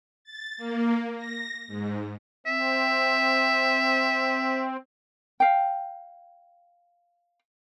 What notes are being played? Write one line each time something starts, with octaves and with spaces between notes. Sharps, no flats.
A6
A#3
A#6
G#2
C4 E5
F5 G5